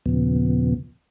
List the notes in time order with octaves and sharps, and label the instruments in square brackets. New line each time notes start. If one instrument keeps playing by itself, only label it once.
[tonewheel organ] D#2 A#2 C#3 F3 B3